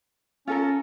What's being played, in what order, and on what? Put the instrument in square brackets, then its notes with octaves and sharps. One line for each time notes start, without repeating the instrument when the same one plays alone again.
[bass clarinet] C#4 [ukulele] F4 A4 A#4